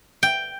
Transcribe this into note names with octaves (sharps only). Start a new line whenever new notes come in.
G5